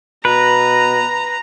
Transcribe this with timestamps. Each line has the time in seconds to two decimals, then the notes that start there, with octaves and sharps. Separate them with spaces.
0.25 B2 B4 A#5